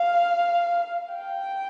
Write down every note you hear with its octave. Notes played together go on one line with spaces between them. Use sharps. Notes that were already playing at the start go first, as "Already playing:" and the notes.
Already playing: F5
G5